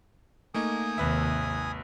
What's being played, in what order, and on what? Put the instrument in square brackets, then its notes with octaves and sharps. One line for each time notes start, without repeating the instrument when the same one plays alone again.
[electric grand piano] A3 A#3 D#4 [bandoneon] G#5 D#6
[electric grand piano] G#1 B4 E5 [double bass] D#2 C3